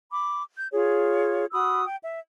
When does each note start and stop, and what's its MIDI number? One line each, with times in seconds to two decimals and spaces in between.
0.11 0.42 83
0.11 0.42 86
0.57 0.67 91
0.73 1.45 65
0.73 1.45 68
0.73 1.45 73
1.52 1.84 66
1.52 1.84 83
1.52 1.84 87
1.52 1.84 88
1.85 1.96 79
2.03 2.19 76